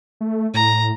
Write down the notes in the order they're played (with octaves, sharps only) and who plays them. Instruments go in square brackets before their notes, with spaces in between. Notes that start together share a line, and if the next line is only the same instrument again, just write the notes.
[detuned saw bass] A3
[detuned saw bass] A2 [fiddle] A#5